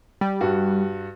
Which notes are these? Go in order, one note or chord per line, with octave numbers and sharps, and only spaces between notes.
G3
G2 F#4